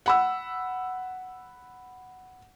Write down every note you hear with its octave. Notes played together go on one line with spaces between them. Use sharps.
F#5 B5 E6